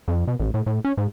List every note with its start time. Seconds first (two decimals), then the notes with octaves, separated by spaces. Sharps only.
0.08 F2
0.27 B2
0.39 A1
0.54 A2
0.66 A2
0.84 C#4
0.97 G#2